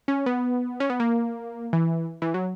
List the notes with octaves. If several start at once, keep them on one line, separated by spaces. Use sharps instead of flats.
C#4
B3
C#4
B3
A#3
E3
E3
F#3